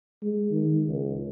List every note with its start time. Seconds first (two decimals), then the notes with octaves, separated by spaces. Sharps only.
0.23 G#3
0.51 D#3
0.88 C#2